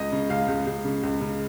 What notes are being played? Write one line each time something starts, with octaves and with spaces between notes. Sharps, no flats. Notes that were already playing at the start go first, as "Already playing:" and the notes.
Already playing: C#2 D#5
C#3
C#2 F5
C#2
C#2
C#3
C#2
C#3